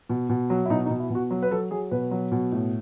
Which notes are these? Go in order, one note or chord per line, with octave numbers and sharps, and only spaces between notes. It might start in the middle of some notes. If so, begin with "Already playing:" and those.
B2
B2
F#3
E4
B2 D#4
D#4
B2
E4
B2 F#4
F#3
B4
F#3 A4
F#3 G#4
B2 B4
F#3
B2
A2